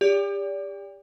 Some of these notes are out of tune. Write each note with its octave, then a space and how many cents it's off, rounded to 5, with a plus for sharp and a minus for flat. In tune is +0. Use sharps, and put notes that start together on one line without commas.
G4 +35 D5 -30